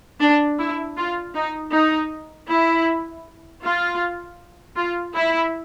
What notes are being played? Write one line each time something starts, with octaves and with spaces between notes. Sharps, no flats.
D4
E4
F4
D#4
D#4
E4
F4
F4
E4